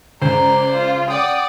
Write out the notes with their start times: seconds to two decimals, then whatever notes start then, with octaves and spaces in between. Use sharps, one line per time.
0.22 C#2 C5 D5 A#5
0.73 F4
1.10 D5 F#5 G5 D#6